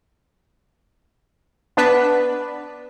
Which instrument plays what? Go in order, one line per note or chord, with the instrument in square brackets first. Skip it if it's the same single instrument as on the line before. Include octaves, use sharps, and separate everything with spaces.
[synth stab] B3 D4 B4